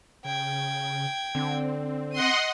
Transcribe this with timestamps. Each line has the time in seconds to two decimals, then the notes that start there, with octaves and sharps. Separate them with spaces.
0.25 C#3 G5 G#6
1.35 D3 C4
2.13 D#5 F#5 C6 D#7